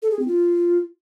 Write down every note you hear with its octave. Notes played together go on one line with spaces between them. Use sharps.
A4
G#4
C4
F4